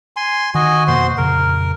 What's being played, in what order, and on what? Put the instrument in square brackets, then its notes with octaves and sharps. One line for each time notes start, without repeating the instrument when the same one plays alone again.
[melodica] G#5 C6
[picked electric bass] D#3 [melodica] F#4 D#5 G#5
[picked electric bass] F2 B2 A#3 [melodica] F#4 C5 C6
[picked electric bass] F2 A#2 C#3 [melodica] A#4